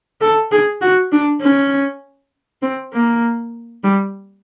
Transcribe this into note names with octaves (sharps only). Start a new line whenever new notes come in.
A4
G#4
F#4
D4
C#4
C4
A#3
G3